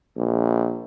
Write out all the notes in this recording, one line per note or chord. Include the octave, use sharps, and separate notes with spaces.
A#1